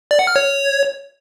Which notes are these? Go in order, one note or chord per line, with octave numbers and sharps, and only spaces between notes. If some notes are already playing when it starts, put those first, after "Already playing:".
D5
F#5
F6
C#5